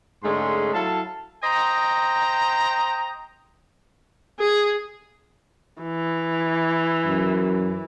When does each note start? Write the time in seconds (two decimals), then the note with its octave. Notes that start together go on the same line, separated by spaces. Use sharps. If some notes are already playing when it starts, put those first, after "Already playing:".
0.23 G#2 D3 G#3 A3 C#4 C6
0.74 F#3 E4 A4 F5 A5
1.44 C5 D#5 G5 A#5
4.39 G#4
5.82 E3
7.05 F#2